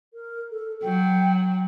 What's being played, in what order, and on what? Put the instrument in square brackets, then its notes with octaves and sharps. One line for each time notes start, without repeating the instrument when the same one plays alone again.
[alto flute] A#4
A4
[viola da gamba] F#3 [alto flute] G5